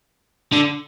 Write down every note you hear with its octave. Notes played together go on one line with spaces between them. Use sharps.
D3